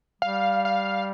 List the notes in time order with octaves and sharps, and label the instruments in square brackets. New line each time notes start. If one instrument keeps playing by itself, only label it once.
[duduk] G3 [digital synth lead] F5
[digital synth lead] F5